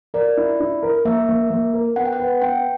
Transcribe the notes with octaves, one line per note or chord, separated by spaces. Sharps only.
A#4 D5
E4
E4
A#4
A#3 E5
A#3
A#3
A#4
B3 F#5
G5
F#5
B4
B3 G5